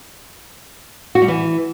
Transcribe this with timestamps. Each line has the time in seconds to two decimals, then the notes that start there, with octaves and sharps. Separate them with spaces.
1.15 F#4
1.22 G3
1.28 E3